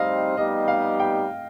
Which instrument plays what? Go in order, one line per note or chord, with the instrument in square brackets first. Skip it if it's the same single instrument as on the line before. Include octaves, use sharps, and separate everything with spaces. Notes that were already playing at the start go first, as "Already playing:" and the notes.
Already playing: [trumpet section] G3 C4 D#4 G4 C5 [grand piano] D#5 F5
[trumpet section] G3 B3 D#4 G4 [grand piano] D#5
[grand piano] F5
G5